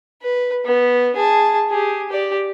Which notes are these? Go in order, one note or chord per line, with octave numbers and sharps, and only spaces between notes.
B4
B3
G#4 A5
G4 G#4
G4 D5